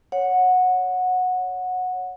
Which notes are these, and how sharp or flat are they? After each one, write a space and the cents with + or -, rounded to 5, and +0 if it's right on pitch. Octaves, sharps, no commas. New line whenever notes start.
C#5 +0 F#5 -15